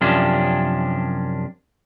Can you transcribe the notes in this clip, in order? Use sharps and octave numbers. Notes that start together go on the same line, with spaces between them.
F#2 C3 F3 C#4 D4